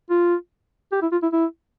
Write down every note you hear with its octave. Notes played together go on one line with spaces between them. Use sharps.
F4
G4
E4
F4
E4
E4